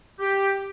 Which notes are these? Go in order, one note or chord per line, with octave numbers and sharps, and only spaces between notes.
G4